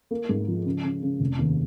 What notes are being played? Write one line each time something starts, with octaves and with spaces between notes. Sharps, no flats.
A#3
G#2
F3
C#3
C#3
C#3
F1
D#2